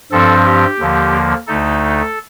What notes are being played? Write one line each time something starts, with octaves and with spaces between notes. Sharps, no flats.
G2 F3 C4 A4
G4
D#2 D3 F3 A#3
D2 D3 A3 D#4 A4